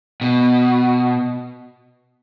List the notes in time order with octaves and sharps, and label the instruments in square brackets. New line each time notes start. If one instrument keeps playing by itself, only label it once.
[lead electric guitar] B2